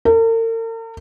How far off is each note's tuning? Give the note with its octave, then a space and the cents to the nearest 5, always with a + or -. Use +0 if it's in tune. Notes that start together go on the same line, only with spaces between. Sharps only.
A#4 -45